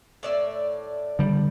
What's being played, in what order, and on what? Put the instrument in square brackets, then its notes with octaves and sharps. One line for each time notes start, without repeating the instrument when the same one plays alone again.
[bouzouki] A2 D5 E5
[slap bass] D3 G3